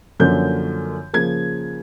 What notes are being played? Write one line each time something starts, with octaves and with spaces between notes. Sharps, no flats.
F#2 D3 F3 A#3 C#4 G6
C#3 F3 A#3 G#6